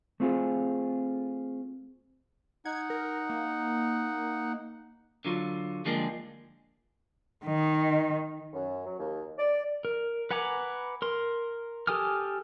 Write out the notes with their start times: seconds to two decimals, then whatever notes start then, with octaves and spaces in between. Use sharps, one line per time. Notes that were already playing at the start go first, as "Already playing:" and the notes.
0.20 A3 C4 F4 G#4
2.65 D#4 F#5 G#6
2.90 A#4
3.29 A#3
5.25 D3 F#3 F4
5.85 D3 F3 G3 G#3 A#3 G#4
7.45 D#3
8.53 F#2
8.86 F#3
8.98 D#2
9.38 D5
9.85 A#4
10.31 B4 F#5 G#5 A#5 D6
11.02 A#4 C6
11.87 G4 A4 G#5 D#6 F6